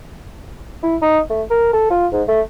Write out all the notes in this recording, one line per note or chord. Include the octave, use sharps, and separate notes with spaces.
E4
D#4
A3
A#4
A4
F4
G#2
A3